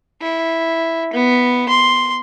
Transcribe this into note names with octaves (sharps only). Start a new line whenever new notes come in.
E4
B3
C6